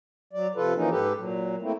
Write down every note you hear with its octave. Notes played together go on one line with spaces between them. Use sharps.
F#3 D5
C3 F3 F4 A4 B4
E3 F3 A#3 C#4 D#4
G#2 G4 A4 B4
A#2 F#3
A3 A#3 C4 E4